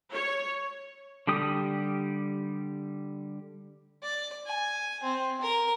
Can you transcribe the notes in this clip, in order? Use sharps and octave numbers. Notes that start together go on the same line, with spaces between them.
C#5
D3 G3 G4 D#6
D5
G#5
C4
A#4